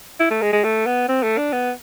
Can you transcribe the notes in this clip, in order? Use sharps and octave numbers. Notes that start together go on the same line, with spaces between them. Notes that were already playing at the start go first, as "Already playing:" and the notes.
E4
A3
G#3
G#3
A3
B3
C4
A3
D4
B3